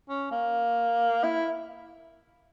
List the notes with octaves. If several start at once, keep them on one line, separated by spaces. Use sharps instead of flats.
C#4
A#3
E4